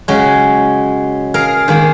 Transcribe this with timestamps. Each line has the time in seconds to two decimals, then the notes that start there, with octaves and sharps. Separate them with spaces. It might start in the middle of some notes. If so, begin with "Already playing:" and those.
0.08 C#3 F#3 G#3
1.34 G#4 A#4 F5
1.68 D#3 G#3 A#3